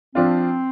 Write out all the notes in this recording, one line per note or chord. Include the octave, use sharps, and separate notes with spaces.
F3 C4 D4 F4